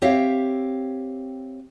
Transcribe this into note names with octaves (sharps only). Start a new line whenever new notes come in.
C4 G4 C#5 E5 F5